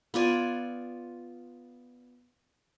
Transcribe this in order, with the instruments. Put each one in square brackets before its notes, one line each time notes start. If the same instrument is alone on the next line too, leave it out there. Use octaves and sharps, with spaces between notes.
[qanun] B3 F4 D5 G#5